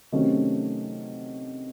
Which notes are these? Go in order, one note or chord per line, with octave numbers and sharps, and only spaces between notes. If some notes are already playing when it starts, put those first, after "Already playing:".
C3 D#3 F#3 A3 C#4